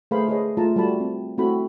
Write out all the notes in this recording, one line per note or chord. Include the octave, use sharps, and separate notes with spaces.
A3 G#4 B4 C5 F5 B5
G#4 B4 C#5 D#5
A3 F4 A5 A#5
G3 A3 F#4 A4 A5 B5
C4
A3 C4 E4 F#4 A4 B5